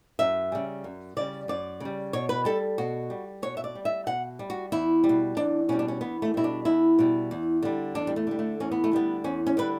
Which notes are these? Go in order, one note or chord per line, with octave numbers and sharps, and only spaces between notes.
F#2 E5
C#3 G3
F#2
C#3 G3 D5
F#2 D5
C#3 G3
B2 C#5
B4
G3 A4
B2 F#4
G3
B2 C#5
E5
D5
G3
E5
B2 F#5
G3
F#4
E2 E4
G3
B2
E2 D4
B2 G3 C#4
D4
C#4
E2 B3
A3
B2 G3 E4
D4
E2 E4
B2 G3
E2
D3 G3
E2 D4
G3
A3
D3 G3
A3
E2 C#4
B3
A3
D3 G3 B3
E2 C#4
C#4
D3 G3 B4